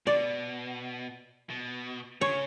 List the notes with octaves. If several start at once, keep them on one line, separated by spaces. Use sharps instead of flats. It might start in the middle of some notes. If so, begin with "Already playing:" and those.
B2 D5
B2
C#3 C#5